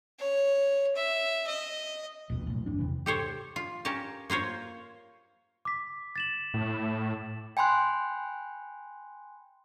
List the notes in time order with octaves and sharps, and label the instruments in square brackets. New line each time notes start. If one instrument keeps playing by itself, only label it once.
[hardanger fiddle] C#5
E5
D#5
[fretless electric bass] D1 A#1 F2 B2
B1 A2
D#1 A1 F#2 D4
E2 C3 E3
[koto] G4 A4 C5 C#5
F4
C#4 G4 A#4 A5
A#3 F4 C5 C#5
[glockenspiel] D6 B6
A6 E7 F#7
[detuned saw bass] A2
[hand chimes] G5 G#5 B5 C6 F#6